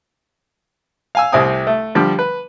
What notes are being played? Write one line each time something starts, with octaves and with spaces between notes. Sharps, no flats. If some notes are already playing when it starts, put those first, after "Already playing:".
F5 G#5 E6
C2 C3 A3 C4 G#5 D#6
A3
D3 F3 G3
B4